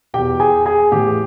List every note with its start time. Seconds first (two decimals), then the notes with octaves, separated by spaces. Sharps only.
0.14 E2 B2 G4 G5
0.40 G#4 G#5
0.66 G#4 G#5
0.92 A2 E3 G4 G5